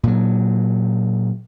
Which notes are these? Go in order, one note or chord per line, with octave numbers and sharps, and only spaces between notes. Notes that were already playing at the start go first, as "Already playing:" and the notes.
A#2 F#3